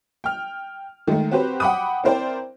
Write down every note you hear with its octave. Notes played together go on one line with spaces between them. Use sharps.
G5 F6
D#3 G#3 A3
C4 F#4 G4 B4 C5
F#5 G5 B5 D6 D#6
C4 E4 A#4 C5 D5 G5